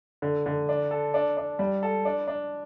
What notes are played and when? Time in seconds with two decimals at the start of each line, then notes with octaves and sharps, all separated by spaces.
0.22 D3
0.46 D3
0.69 D4
0.91 A4
1.14 D4
1.37 D4
1.59 G3
1.83 A4
2.05 D4
2.28 D4